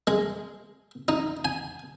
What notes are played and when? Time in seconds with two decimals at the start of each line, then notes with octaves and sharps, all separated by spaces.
0.07 G#3
1.08 D#4
1.45 G#5